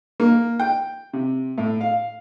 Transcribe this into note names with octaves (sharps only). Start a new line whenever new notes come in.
A#3
G5
C3
A2
F5